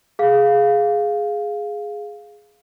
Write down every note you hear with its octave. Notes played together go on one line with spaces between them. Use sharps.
G#4 F5